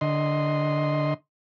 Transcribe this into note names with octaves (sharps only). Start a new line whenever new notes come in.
D3 D#5 C6